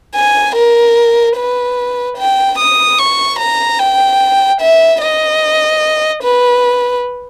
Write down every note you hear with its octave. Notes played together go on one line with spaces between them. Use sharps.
G#5
A#4
B4
G5
D#6
C#6
A#5
G5
E5
D#5
B4